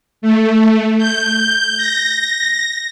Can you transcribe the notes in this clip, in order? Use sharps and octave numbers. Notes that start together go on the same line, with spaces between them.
A3
G6
A#6